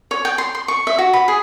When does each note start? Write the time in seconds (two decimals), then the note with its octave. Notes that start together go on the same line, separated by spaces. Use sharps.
0.11 C#5
0.25 G5
0.38 C6
0.55 C6
0.68 C#6
0.87 E5
0.98 F#4
1.13 B5
1.28 G#4